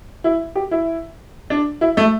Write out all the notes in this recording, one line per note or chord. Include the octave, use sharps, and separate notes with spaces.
E4
G4
E4
D4
E4
A3